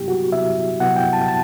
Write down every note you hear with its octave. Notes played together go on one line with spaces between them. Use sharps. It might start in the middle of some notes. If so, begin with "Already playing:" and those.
Already playing: C3 F#3 B3 E4 G4
F#4
C3 F#3 B3 E4 E5
C3 F#3 B3 E4 F#5
G5
A5
A5